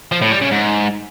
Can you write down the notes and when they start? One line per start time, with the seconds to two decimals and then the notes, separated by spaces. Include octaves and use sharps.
0.12 F3
0.22 A2
0.31 G3
0.41 C#3
0.51 G#2